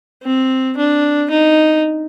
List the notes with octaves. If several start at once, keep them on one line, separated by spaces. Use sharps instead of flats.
C4
D4
D#4